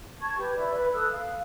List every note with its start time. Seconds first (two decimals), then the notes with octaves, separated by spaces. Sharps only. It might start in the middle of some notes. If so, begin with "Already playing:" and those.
0.21 A5 C#6 G#6
0.38 G4 B4
0.56 E4 B4 D5
0.74 B4 B5
0.94 A4 D#6 E6 F#6
1.11 F5